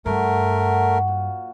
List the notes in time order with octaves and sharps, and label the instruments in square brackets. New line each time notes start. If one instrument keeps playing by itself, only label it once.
[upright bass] G2 [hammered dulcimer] F#3 [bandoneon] A3 A#4
[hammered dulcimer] F#4 F#5
A#2